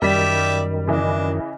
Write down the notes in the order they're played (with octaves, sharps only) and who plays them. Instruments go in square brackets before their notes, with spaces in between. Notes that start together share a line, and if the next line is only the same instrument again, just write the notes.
[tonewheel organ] F#2 D#3 [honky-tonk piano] G3 B6 [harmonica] G4 D5 E5
[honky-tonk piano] C#3 E3 D#5 [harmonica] D4